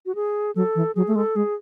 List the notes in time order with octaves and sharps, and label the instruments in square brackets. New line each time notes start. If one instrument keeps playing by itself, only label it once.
[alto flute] F#4
G#4
[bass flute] F#3 [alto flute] A4
[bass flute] E3
[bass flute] F#3 [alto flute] G#4
[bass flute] A3
[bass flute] G#3 [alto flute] A4
[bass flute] G#3 [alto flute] G#4